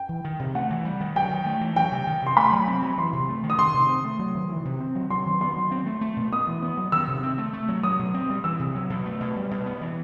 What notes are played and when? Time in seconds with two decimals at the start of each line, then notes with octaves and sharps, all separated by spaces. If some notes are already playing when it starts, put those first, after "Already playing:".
Already playing: G5
0.09 E3
0.25 D#3
0.39 C3
0.55 A3 F#5
0.70 E3
0.85 G3
1.01 D#3
1.16 F#3 G5
1.31 D#3
1.46 A3
1.61 E3
1.76 F#3 G5
1.92 C3
2.07 D#3
2.22 C3 C6
2.37 A3 B5
2.52 F#3
2.68 C4
2.82 F#3
2.98 E3 C6
3.13 C3
3.28 A3
3.43 D#3
3.50 D#6
3.58 D#3 C6
3.74 C3
3.89 C4
4.05 A3
4.19 F#3
4.35 D#3
4.50 E3
4.65 C3
4.80 C4
4.95 F#3
5.10 F#3 C6
5.26 D#3
5.41 B3 C6
5.56 F#3
5.71 C4
5.86 A3
6.01 A3
6.17 B2
6.32 B3 D#6
6.47 E3
6.62 B3
6.77 F#3
6.92 D#3 E6
7.08 C3
7.23 C4
7.38 A3
7.53 A3
7.69 F#3
7.83 F#3 D#6
7.99 B2
8.14 C4
8.30 G3
8.44 E3 E6
8.60 C3
8.75 F#3
8.90 B2
9.06 A3
9.20 B2
9.36 G3
9.51 B2
9.66 B3
9.81 E3